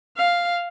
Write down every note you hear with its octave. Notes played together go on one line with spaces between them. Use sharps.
F5